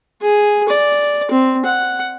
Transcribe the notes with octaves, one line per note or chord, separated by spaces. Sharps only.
G#4
D5
C4
F#5